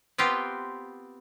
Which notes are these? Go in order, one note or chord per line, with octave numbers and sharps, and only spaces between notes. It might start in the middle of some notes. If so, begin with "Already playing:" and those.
B3 C4 F4 G4